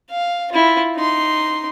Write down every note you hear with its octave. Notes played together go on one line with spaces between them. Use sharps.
F5
E4 F4
D#4 C6